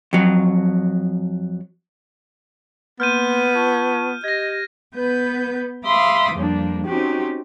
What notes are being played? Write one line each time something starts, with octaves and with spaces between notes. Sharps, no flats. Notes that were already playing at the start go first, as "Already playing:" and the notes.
F2 F#3
A#3 B3 C6 F6 G6 D#7
F4 A5 C#6
G4 D#5 G#6 A#6
B3 B4 G6
E5 F5 B5 C6 D6 D#6
F2 G3 A#3 D4
C4 C#4 D#4 F#4 G4